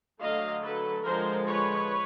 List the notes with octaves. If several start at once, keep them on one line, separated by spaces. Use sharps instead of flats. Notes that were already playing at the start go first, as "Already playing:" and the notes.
D3 F#3 A3 D#5 F5
A4 B4
D3 F3 G#3 A#4 C5
B4 C#5